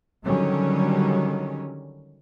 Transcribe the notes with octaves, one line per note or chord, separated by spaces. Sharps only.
D3 D#3 F#3 G3 C#4